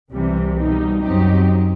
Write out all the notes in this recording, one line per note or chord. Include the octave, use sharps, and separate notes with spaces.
C2 C3 E3 G3
B2 G3 D#4
F#2 F#3 C4 D#4 G4